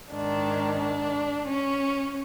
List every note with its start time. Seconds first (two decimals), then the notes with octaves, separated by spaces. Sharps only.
0.12 G#2 D#3 D4
0.79 D4
1.46 C#4